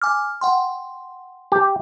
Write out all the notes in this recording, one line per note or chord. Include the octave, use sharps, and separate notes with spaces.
G#5 D6 F6
F#5 G5 C6
G4